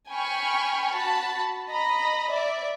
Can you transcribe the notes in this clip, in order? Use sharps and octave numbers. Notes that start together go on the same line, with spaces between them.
G5 G#5 B5 C#6 F6
F#4 A5 B5
D#5 A#5 B5
D5 E5